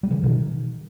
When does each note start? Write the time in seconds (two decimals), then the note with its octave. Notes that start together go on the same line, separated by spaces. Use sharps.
0.03 G3
0.10 C#3 E3
0.23 B2 D#3